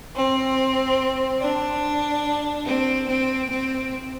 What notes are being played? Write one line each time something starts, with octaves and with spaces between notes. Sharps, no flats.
C4
D4
C4
C4
C4